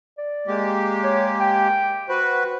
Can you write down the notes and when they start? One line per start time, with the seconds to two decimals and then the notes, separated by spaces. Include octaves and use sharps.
0.18 D5
0.47 G#3 A#3 G4
1.04 C#5
1.41 G5
2.09 F#4 B4 C5